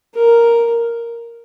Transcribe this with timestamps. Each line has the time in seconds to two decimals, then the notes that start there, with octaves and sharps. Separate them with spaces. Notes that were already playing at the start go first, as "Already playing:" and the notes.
0.15 A#4